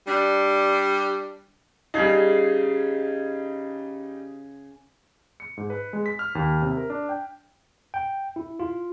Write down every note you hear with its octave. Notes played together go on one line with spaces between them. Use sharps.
G3 D4
C#3 G3 D#4 G#4
C#7
G#2
B4
G#3
B6
F6
D#2
C3
A#4
D4
G5
G5
E4
F4